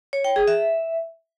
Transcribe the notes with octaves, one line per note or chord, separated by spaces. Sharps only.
C#5
G5
G#4
E5